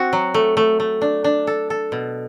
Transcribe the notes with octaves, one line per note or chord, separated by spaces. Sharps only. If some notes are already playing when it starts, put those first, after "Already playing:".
Already playing: C4 F#4
F#3
A3
A3
A3
D4
D4
A4
A4
B2